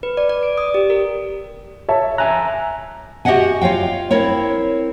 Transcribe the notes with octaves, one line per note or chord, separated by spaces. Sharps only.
B4
D5
D5
D7
D#6
G4
A#4
C#5 E5 A5
E5 G#5 A#5 F#6
F#4 G4 D#5 E5 F#5 G#5
F4 C#5 F5 G5
C4 E4 A#4 C#5